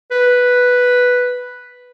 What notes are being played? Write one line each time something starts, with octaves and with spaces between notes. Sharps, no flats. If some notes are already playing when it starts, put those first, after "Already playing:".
B4